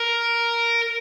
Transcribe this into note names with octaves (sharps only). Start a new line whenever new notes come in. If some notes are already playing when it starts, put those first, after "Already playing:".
Already playing: A#4